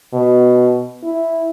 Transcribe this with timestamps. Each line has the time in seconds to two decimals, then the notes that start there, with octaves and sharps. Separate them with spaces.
0.13 B2
1.04 E4